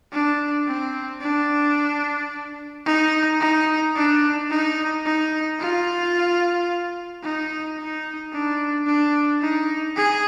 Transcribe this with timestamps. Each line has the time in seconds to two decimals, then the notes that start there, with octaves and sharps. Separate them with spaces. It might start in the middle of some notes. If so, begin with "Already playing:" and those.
0.13 D4
0.67 C4
1.21 D4
2.87 D#4
3.40 D#4
3.96 D4
4.50 D#4
5.05 D#4
5.60 F4
7.24 D#4
7.78 D#4
8.33 D4
8.87 D4
9.42 D#4
9.96 G#4